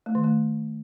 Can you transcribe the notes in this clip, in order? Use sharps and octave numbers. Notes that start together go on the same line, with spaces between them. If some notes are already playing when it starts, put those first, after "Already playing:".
A3
D#3
A3